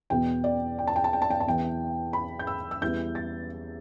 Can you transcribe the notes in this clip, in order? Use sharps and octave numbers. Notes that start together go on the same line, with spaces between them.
E2 B2 B3 G5
D5
G5
A5
G5
A5
G5
A5
G5
A5
E2 E3 B3 G5
B5
G6
E6
E6
E2 E3 G3 B3 G6
A6